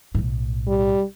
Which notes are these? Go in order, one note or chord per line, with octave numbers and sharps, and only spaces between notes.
B1 A2
G3